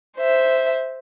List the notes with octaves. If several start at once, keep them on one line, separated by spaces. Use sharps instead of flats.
C5 E5